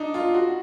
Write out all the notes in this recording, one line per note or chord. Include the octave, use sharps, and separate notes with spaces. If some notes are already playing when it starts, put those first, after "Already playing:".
Already playing: D4 D#4
F4
F#4